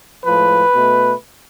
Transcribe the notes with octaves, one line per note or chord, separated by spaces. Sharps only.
A2 F3 G#3 B4
B2 A3